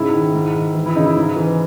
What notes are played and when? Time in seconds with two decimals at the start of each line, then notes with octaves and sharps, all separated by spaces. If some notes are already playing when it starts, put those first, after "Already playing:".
Already playing: G#2 C#3 E4
0.14 D#3
0.34 G#2
0.55 D#3
0.75 E3
0.86 E4
0.95 C#3 D#4
1.06 E4
1.16 G#2
1.36 E3